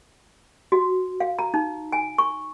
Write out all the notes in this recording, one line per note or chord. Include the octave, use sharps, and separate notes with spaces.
F#4
F5
A#5
D#4
G#5
C#6